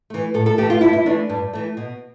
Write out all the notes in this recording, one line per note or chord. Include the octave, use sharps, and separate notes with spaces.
E3 A3
A2 A4
A4
E3 A3 G4
F4
G2 E4
E4
E3 A3 D4
G2
E3 A3
B2